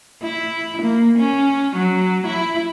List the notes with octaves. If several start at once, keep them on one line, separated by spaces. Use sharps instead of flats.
E4
A#3
C#4
F#3
E4